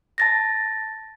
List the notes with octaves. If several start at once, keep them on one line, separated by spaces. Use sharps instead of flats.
A5 A6 A#6